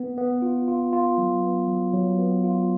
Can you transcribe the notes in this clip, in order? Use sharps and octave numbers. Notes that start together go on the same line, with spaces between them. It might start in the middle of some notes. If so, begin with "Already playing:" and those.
Already playing: B3
B3
F4
F4
F4
F#3
B3
F#3
F#3
B3
F4